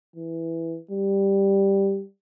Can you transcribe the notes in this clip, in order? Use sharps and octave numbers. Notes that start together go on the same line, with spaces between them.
E3
G3